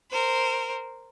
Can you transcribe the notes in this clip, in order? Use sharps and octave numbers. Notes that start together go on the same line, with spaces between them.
A#4 C5